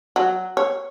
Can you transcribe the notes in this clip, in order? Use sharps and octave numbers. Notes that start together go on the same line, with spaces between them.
F#3
C#5